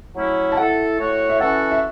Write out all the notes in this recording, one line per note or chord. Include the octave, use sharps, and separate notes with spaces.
F#3 A3 C#4 E4 C#5
A5
A3 E4 A4 F#5
A2 A3 F#4 C#5
E5
E3 C#4 F#4 A4 F#5
E5